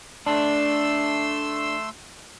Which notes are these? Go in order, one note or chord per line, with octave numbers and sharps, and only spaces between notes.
A3 D4 C6 E6